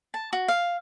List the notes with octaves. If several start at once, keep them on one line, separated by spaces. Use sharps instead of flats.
A5
F#4
F5